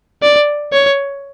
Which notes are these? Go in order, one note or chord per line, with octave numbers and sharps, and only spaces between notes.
D5
C#5